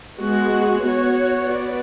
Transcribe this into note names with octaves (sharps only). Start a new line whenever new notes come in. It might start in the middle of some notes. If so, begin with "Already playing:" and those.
G#3 B3 F#4
B3 F#4 C#5
B3 F#4 B4 D5